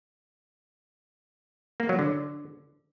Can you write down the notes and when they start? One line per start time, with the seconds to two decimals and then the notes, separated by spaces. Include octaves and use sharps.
1.80 A#3
1.89 F#3
1.99 D3